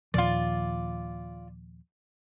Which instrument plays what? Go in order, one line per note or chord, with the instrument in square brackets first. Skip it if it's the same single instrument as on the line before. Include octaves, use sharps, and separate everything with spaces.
[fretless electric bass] D#2 A#2 F3 [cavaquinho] F4 D5